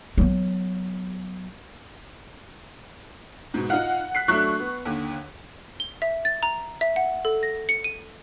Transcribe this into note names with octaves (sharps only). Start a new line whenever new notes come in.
F#3 B3
G#2 B2
D#4 F4 F5 F#5
F#6 B6 C7
F#3 A3 D4 C#6 F#6
B3
D#2 D3
G7
E5
A6
A#5
E5
F#5
A4
A#6
C#7
D#7